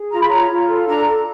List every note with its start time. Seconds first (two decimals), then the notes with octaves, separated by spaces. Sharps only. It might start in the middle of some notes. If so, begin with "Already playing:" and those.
Already playing: G#4
0.11 F4 A#5
0.20 B5
0.29 C#5 A#5
0.49 F4
0.68 A4
0.87 D4 A#5
1.05 A4